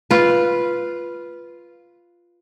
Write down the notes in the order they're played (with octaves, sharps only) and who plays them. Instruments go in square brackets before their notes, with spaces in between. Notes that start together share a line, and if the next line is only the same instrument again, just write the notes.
[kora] F4 B4